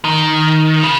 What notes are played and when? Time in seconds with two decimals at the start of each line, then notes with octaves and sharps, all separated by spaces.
0.05 D#3
0.83 C#3